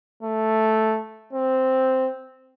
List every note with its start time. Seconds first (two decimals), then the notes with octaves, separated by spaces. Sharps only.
0.23 A3
1.33 C4